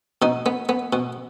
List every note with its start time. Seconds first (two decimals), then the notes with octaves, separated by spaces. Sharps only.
0.22 B2 D#4
0.46 B3
0.69 B3
0.93 B2